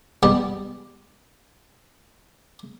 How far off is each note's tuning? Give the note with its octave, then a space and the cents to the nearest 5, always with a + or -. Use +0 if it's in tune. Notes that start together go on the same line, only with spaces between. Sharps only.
G3 +0 B3 +0 G4 +0